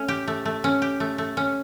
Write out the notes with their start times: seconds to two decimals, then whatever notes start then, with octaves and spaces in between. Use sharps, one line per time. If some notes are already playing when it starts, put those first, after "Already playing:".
Already playing: A3 C#4
0.08 G4
0.27 A3
0.45 A3
0.64 C#4
0.82 G4
1.00 A3
1.18 A3
1.37 C#4